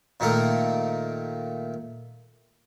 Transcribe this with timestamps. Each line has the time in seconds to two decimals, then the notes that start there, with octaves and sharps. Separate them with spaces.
0.20 A#2 D#3 A3 A#3 A#4